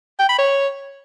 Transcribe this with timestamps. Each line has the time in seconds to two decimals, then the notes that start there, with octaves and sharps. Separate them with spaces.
0.19 G5
0.29 B5
0.38 C#5